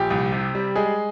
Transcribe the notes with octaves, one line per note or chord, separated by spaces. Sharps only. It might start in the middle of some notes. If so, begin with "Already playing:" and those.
Already playing: A#1 G4
C2
C3
G3
G#3 G#4